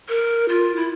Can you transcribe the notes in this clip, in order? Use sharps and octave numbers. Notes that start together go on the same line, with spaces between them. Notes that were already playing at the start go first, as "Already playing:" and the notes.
A#4
F4
E4